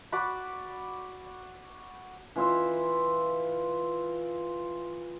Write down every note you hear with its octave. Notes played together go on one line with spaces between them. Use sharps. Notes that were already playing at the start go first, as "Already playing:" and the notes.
F#4 D5 F#5 B5
E3 F4 E5